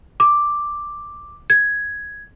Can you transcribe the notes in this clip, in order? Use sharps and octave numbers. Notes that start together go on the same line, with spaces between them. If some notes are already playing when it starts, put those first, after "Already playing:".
D6
G#6